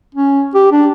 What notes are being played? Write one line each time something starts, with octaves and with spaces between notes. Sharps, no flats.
C#4
G4
D4